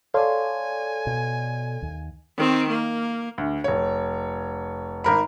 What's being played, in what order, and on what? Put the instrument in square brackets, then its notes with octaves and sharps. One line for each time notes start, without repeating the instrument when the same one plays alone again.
[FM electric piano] A4 D5 [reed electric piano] C#5 F5 C6 [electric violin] G#5
[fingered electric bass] B2
D#2
[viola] D#3 C4
A#3
[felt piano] D2
F1 C#5
G#1 A#4 B5